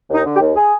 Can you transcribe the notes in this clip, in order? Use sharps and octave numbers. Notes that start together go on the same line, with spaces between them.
D#2 D#4
D3
G4
D#2
G#4